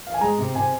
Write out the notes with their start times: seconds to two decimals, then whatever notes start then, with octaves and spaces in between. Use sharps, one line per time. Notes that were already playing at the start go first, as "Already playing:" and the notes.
0.07 F5
0.14 G#5
0.21 G#3 A#5
0.38 C3
0.55 C3 G#5